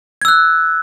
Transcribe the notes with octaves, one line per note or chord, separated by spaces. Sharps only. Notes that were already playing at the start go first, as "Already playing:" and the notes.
E6 F#6 G#6